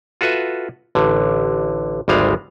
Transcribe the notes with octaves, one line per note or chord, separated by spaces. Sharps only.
F4 F#4 A4 B4 E5
A1 D3
G#1 D2 G3 G#3 F5